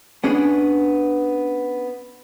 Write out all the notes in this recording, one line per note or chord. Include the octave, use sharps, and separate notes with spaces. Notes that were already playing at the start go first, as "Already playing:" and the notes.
B3 C#4 D4 G#4